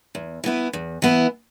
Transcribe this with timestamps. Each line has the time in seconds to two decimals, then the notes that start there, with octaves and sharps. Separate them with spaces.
0.15 E2
0.44 E3 B3 E4
0.73 E2
1.02 E3 B3 E4